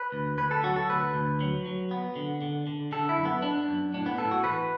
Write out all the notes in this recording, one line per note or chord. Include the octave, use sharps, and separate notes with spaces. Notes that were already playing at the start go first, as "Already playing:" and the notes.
Already playing: B4
D2
D2 B4
A4
F#3 F#4
A4
D2 B4
D2
F#3
F#3
B3
D3
D3
D3
D3 A4
E4
F#2
B3
B3 D4
F#2
A2 D4
B3
A2 A4
F#4
E3 B4